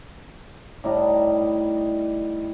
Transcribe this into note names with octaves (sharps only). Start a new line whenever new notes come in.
A2 G3 D#4